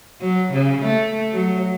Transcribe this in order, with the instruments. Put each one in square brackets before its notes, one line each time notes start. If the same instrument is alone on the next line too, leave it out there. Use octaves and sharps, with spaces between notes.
[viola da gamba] F#3
C#3
A3
F#3